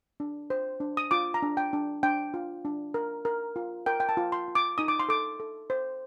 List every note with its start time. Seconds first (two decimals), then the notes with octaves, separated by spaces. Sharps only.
0.20 D4
0.50 C5
0.80 D4
0.97 D#6
1.11 F4 D6
1.34 A#5
1.43 D4
1.57 G5
1.73 D4
2.03 D4 G5
2.34 F4
2.65 D4
2.94 A#4
3.25 A#4
3.56 F4
3.86 A#4 G5
4.00 G5
4.09 A5
4.17 F4
4.32 C6
4.48 F4
4.55 D6
4.78 D#4 D#6
4.88 D6
5.00 C6
5.09 A4 D6
5.40 A4
5.70 C5